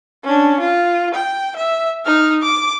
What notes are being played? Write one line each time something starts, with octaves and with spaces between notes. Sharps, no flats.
C#4 D4
F4
G5
E5
D#4 F6
D6